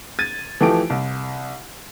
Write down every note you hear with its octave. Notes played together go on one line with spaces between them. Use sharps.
G#6 A6 D#7
E3 F3 A3 G4 A5 D7
C2